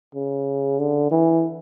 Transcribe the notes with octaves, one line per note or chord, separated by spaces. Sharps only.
C#3
D3
E3